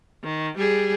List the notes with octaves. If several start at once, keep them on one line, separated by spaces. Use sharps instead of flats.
D#3
G3 G#4